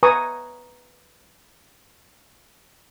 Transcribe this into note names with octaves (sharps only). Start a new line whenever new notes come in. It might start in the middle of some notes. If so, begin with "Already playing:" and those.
B4 G#5 A#5 C#6 D#6